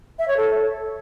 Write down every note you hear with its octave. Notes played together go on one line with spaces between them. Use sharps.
E5
C#5
A4